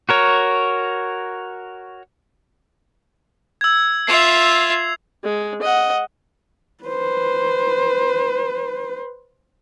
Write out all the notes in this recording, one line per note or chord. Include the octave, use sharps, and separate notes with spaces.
F#4 A#4 C#5
E6 G#6
F4 E5 C7 F7
G#3
D#5 F#5
B4 C5